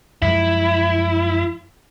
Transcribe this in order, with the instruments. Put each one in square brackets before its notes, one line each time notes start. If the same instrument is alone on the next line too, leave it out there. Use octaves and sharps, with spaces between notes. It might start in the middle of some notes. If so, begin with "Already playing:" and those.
[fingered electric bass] F#2 F3 G#3 [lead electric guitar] E4